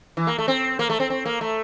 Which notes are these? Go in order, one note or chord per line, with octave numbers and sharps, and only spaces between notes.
E3
A#3
A3
C4
A#3
A3
C4
C4
A#3
A3